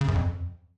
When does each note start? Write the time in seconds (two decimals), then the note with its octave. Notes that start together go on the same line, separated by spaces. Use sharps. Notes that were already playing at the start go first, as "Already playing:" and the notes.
0.01 C#3
0.08 F#2
0.15 F2